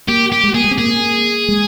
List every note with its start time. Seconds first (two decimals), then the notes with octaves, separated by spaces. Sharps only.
0.08 A#3 G4
0.32 G4
0.44 G#3
0.54 A#3 G#4
0.64 G#3
0.71 C4
0.78 A#3 G#4
1.49 G#3